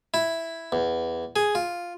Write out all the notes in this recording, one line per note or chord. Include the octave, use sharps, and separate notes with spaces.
E4
E2
G#4
F4